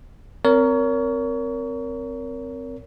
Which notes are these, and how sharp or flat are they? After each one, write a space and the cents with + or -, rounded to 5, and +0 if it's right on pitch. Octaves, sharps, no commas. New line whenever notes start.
C4 -10 A#4 +0 C#5 +30